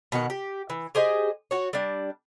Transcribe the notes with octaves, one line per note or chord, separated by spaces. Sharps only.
B2 D#3 E4 F#5
G4
E3
G4 G#4 C5 D#5
F#4 C#5
G3 D4